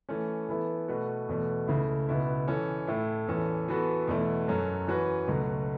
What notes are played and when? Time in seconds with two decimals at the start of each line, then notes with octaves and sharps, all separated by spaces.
0.09 E3 A3 C#4
0.49 E3 B3 E4 A4
0.88 B2 A3 F#4 B4
1.28 E2 B2 A3
1.68 C#2 C#3 A3 E4
2.09 C#2 B2 B3 E4
2.48 E3 C#4 A4
2.87 A2 A3 E4 A4
3.27 E2 E3 C#4 A4
3.68 E3 B3 F#4 A4
4.08 E2 B2 A3 E4
4.47 F#2 F#3 C#4 A4
4.87 E3 C#4 F#4 B4
5.27 C#2 B2 F#3 A3